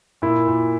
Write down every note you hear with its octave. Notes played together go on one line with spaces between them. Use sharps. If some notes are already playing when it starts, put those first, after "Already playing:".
A#2 E4
A#2